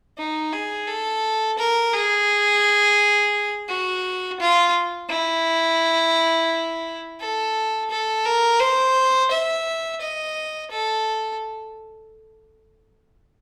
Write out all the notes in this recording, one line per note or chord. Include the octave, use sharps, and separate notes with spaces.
D#4
G#4
A4
A#4
G#4
F#4
F4
E4
A4
A4
A#4
C5
E5
D#5
A4